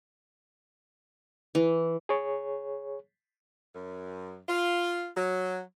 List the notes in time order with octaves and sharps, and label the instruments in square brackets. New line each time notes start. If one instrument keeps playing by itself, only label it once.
[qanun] E3
[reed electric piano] G#4 C#5
[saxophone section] F#2
F4
F#3